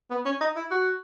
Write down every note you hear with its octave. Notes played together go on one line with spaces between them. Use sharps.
B3
C#4
D#4
E4
F#4